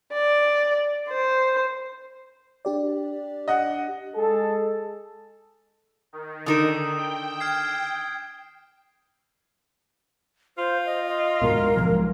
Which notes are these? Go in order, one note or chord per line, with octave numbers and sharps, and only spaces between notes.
D5
C5
D4 G4 D5
D#5 F#5
G#3 G#4 A4
D#3
D3 D#4 A#4 D#6 E6 E7
G5
F6 G#6 C7
F4 C5
D#5
D#5
D2 G#2 B2 A#4
B1 F3 G#3